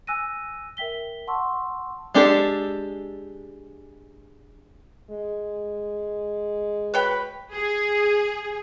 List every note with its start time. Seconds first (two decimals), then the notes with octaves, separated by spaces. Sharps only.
0.07 G#5 E6 F#6 A#6 D#7
0.77 A#4 E5 G5 B6 G7
1.27 F#5 A5 C6 C#6 E6
2.14 G#3 D4 G4 A4
5.10 G#3
6.94 F#4 B4 C#5 G5
7.53 G#4